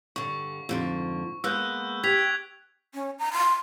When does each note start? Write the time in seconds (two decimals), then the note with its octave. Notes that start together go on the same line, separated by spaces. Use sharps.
0.16 G2 D3 C#6
0.69 F2 G#2 D3
1.44 G#3 A#3 B3 E6 F#6 G6
2.04 G4 G#6 B6 F7
2.94 C#4
3.19 A#5
3.33 C6